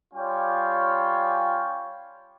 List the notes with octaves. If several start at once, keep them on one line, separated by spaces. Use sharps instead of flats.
G3 C#4 F4 C#5 G5